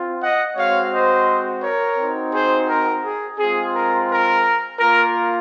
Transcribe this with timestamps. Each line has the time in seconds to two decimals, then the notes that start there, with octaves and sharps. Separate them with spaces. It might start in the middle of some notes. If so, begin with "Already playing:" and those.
Already playing: C4 F4
0.21 D#5 F#5
0.57 G#3 C4 F#4 C#5 F5
0.92 C5 D#5
1.63 A#4 C#5
1.98 C4 D#4 F#4
2.33 G#4 C5
2.69 A#4
3.04 G#4
3.39 G#3 C4 F4 G#4
3.75 A#4
4.10 A#4
4.80 A#3 F4 A#4